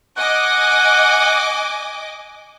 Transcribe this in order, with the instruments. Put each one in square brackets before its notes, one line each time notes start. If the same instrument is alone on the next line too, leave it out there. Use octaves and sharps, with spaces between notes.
[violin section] D#5 G#5 D6 [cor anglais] F#5